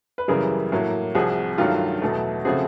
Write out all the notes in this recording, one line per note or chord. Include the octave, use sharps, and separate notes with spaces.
B4
F#2 C#3 E3 G3 G#4 A#4
A2 F#3 A#3
C2 C3 F3 F#4 G#4
G2 D#3 F#3 A3 F4 G4
E2 B2 F#3 A3
C#3 F3 A3 C4 F#4 G#4